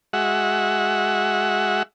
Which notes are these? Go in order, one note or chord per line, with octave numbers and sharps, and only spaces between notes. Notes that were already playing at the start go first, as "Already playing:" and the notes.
G#3 F#4 E5 F#5